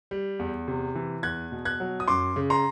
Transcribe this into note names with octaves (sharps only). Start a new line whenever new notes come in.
G3
E2
C3
E3
E2 F#6 G#6
B2
F#6 G#6
F#3
D#6
F#2 C6 D6
C#3
A#5 C6